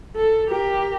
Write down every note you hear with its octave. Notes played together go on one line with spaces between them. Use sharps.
A4
G4 A#4